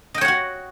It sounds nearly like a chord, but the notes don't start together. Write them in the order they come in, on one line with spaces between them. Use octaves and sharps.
D#5 G5 C#5 F#5 F#4